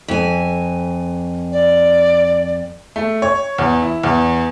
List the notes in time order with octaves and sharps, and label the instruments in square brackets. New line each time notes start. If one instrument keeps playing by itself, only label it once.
[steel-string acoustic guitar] F2 G#5
[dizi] D5
[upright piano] A3
C#5
E2
E4
E2